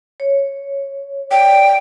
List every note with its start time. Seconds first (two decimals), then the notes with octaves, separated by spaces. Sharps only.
0.20 C#5
1.31 D5 G5